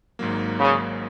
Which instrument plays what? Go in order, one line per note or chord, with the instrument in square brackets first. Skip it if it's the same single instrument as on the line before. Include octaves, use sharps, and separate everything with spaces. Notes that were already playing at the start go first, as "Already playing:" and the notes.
[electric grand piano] G#1 G#2 F#3 A#3
[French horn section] C#3